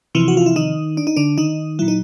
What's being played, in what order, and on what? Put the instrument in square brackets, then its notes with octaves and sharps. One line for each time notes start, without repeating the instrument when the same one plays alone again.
[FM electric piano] C3 E3 F3 E4
F#4
F4
E4
D#3 D#4
D4
D#4
D3 D4
D#3 D#4
A#2 F#3 E4
D#4